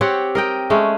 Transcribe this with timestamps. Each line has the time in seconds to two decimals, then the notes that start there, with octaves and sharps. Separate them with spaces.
0.01 C4 G4 C#5 F#5
0.35 A#4 D#5 G5
0.70 G#3 A3 C#4